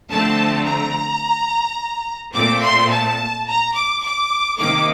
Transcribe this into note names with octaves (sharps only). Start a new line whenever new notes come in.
D3 F3 A3 C4 A5
A#5
A#2 A3 C4 D6
C6
A5
A#5
D6
D6
C3 D#3 A#3 D6